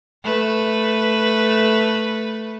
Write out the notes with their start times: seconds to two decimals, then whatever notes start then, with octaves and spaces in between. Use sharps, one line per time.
0.24 A3 B4